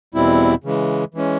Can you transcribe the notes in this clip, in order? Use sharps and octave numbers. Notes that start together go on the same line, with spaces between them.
E2 B2 G3 C4 E4
C#3 E3 G#3
E3 G#3 C#4